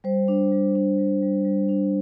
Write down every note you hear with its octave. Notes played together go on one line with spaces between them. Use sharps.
G3 C5
D4
G3
D4
G3
G3
G3
D4